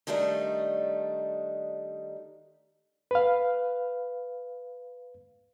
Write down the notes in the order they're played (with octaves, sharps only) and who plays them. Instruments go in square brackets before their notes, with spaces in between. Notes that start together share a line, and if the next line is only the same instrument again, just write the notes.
[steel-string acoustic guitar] D#3 G3 A3 D4 D#4
[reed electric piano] B4 F5